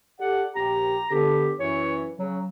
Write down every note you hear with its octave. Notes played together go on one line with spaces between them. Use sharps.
G4 A4 D5 F#5
A#1 G4 A#5
D3 B3 G4 A4
F#2 E3 C#5
C#3 F#3